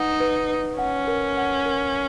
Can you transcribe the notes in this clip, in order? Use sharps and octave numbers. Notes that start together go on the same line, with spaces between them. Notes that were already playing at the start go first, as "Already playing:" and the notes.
Already playing: D#4 B4 F#5
B4
B4
C#4 F#5
A#4
F#5
A#4